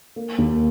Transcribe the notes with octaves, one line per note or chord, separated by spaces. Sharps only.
A#3
D#2